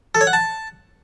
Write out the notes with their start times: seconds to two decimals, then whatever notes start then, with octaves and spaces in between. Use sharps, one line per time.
0.15 A4
0.21 C#5
0.27 F#5
0.33 A5